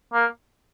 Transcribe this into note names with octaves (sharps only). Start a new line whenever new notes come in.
A#3